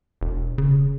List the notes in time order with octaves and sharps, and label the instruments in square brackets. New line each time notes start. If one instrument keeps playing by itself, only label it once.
[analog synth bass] E1
C#3